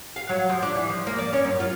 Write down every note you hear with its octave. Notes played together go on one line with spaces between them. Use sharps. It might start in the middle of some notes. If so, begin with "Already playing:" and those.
F5
F#3
F3
D4
E3
F3
A#3
D5
C#4
F#2
F4